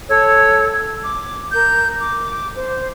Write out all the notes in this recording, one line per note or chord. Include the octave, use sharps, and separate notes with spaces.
A4 C#5 E6
D6
A#4 G6
D6
C5